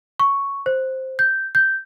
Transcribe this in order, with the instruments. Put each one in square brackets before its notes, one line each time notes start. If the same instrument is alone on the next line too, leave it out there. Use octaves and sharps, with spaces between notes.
[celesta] C#6
C5
G6
G6